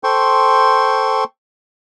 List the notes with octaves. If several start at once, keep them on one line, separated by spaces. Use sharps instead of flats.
A4 C5 G5 C6 C#6